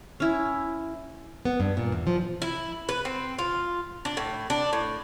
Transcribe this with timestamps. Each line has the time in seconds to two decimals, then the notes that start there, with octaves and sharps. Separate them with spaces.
0.20 C#4 E4
1.45 B3
1.60 G2
1.77 A#2
1.92 E2
2.07 F3
2.42 E4
2.89 B4
3.05 C4
3.39 F4
4.05 D4
4.17 A2
4.50 D4
4.73 A2